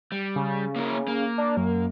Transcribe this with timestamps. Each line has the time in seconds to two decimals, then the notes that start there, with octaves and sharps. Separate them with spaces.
0.12 G3
0.36 C#3
0.76 A#3 E4 A#4
1.08 A#3
1.38 D4
1.57 F#2